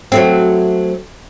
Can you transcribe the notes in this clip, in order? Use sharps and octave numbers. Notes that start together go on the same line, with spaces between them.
F#3 A3 C4